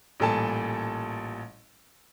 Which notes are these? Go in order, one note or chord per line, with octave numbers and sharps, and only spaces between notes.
A1 A#2 G3 A4 G#5 A5